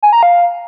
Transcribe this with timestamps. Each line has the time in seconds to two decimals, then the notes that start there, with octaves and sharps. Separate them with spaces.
0.03 G#5
0.13 A#5
0.23 F5